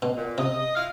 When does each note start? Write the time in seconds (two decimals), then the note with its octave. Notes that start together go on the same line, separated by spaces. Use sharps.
0.02 B2
0.17 A#2
0.38 C3 D#5
0.76 E4 F4 F5